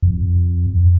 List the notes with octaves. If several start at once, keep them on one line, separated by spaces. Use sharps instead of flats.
F2